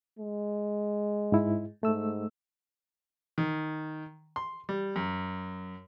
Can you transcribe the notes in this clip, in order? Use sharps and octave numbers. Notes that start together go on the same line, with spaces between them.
G#3
G#2 E4
G#2 A3 E6
D#3
C6
G3
F#2